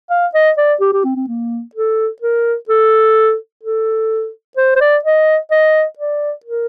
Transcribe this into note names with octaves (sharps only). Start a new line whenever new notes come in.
F5
D#5
D5
G4
G4
C4
C4
A#3
A4
A#4
A4
A4
C5
C5
D5
D#5
D#5
D5
A#4